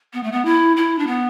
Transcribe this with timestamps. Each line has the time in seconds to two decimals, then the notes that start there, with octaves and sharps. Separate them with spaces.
0.14 B3
0.24 A3
0.32 B3
0.45 E4
0.77 E4
0.99 D4
1.07 B3